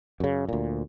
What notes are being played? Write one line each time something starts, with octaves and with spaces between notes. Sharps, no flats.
F#2 C#3
D2 A#2